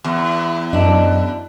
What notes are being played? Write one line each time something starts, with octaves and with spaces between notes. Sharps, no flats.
E2
F#2 D4 D#5 E5